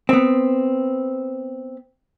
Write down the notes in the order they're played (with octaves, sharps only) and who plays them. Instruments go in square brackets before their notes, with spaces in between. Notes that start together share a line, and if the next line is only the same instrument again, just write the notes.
[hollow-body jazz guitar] B3 C4